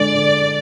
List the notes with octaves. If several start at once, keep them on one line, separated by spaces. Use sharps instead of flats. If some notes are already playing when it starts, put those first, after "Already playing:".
Already playing: D3 G#3 D4 A4 D5
D3